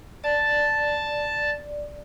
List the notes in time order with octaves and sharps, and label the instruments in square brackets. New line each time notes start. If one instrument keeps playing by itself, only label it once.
[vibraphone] D5 [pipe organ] A5